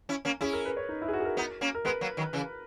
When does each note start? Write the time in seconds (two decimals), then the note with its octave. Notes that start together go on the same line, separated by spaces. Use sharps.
0.09 C#4 E4
0.25 A#3 C#4
0.41 C#4 E4 G#4
0.53 A#4
0.65 B4
0.77 C#5
0.89 D#4
1.02 E4
1.08 G#4
1.13 F#4
1.20 G#4
1.25 A#4
1.37 B3 D#4
1.61 A#3 C#4
1.75 A#4
1.85 G#3 B3 B4
2.01 F#3 A#3
2.17 D#3 F#3
2.33 C#3 E3